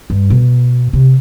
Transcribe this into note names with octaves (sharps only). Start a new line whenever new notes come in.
G2
B2
C3